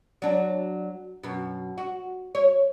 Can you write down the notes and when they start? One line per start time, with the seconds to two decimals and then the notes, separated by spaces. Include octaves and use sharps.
0.22 F#3 D4
1.23 F#2 B2
1.78 F#4
2.35 C#5